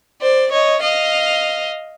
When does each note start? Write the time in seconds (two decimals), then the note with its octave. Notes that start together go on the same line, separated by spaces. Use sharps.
0.22 C5 D5
0.52 C#5 D#5
0.83 D#5 F5